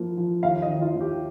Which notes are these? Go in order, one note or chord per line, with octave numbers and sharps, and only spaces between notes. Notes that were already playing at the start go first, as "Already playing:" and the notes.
Already playing: F3 A#3
F3
D#2 F5
D#5
D#3
F4
D#2
G4